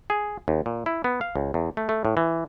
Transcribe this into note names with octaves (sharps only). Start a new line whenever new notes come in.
G#4
D#2
A#2
E4
B3
F5
C#2
E2
A3
A3
A2
E3